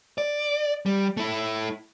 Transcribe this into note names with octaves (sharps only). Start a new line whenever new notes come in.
D5
G3
A3 E4